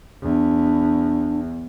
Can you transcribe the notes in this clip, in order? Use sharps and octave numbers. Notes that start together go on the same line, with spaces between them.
E2 D4